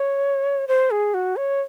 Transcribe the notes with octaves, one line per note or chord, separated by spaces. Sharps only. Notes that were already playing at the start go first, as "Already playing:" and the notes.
Already playing: C#5
C5
G#4
F#4
C#5